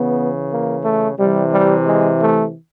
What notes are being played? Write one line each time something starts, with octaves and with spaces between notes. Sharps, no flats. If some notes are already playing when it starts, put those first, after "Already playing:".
Already playing: C#3 E3 B3
A#3
A3
C3 E3 G3
G3
G#3
A3